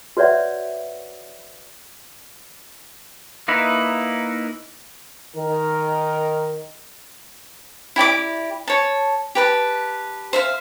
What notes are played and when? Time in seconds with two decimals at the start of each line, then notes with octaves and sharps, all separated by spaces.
0.17 F#4 B4 C#5 D5 E5 F#5
3.48 A#3 D#4 E4 B4
5.36 D#3 A#4
7.96 E4 G4 D5 D6
8.68 C#5 A5
9.35 G4 B4 A5
10.33 C5 E5 F5